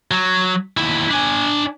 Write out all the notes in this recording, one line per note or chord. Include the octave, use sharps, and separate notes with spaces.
F#3
D#2 E4
D4 G#5